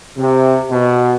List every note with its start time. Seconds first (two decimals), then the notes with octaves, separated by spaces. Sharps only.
0.17 C3
0.70 B2